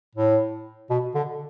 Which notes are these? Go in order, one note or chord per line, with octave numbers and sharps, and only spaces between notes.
A2
B2
D3